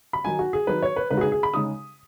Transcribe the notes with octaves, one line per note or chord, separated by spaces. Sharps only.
B5
D#3 F#3 D#4 G#5
F#4
G#4
D#3 F#3 D#4 B4
C#5
B4
C#3 G#3 D#4 B4
F#4
G#4
G#4
B5
C#3 G#3 D#4 D#6